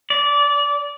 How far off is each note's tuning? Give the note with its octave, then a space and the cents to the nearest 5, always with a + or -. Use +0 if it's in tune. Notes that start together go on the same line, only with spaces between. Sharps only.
D5 -20